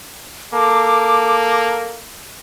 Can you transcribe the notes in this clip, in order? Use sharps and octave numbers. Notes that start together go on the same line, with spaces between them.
A#3 A4 D6